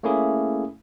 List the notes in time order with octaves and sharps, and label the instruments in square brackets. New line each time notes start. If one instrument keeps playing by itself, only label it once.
[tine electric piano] A3 A#3 C#4 E4 G#4